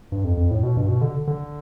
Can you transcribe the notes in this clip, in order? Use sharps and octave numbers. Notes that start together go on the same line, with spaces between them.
G2
F2
F2
A2
B2
G2
B2
D3
D3